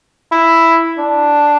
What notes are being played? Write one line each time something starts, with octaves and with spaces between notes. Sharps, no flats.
E4
D4